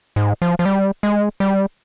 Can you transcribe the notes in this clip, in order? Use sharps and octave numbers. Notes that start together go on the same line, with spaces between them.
G#2
F3
F3
G3
G#3
G3